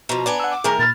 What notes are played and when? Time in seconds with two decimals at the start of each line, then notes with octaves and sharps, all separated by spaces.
0.09 B2 F3 A#5
0.26 B3 D4 D5 G#5
0.40 F#5 E6
0.51 D6
0.64 D#3 A3 G#4 A#4 G#5 A#5
0.79 A#2 B5 F6 A6